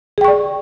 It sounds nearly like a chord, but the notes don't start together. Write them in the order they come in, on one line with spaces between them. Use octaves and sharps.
G#4 G5 C#6 D5